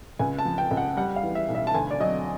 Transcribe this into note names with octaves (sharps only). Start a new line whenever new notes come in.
C#2 G#5
A5
F3
G5
C#2
F#5
G3 F#5
F5
E3
E5
B1
E5
A5
D2 G#5
D5
F#3 D#5